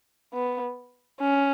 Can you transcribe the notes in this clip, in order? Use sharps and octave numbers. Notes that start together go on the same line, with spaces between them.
B3
C#4